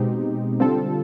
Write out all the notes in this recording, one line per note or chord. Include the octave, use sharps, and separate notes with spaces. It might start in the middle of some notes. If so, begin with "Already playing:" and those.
Already playing: B2 G#3 C4 D#4 G4
D3 G3 C4 F4 A4